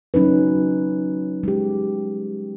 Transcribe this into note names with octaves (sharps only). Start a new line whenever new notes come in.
F#3 C#4 D#4 B4
G#3 G4